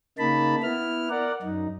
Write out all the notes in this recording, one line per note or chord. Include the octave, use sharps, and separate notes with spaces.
C#3 A#3 D#4 A5 B5
B3 E4 F6
A#4 D5 F#5
F#2 D#4